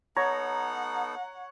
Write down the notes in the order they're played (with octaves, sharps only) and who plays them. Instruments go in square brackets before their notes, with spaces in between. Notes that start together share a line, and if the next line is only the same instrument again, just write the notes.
[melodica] B3 D#4 A4 [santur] C#5 [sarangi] F#5 [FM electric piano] A#5